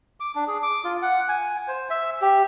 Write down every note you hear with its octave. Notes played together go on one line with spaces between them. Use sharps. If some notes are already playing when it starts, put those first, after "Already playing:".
D6
D4
G#4
D6
F4
F#5
G#5
C5
E5
G4